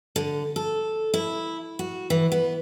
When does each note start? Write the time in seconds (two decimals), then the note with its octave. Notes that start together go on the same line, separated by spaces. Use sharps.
0.16 D3
0.56 A4
1.14 E4
1.79 F#4
2.10 E3
2.32 B3